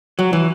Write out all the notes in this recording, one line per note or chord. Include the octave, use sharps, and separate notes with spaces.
F#3
E3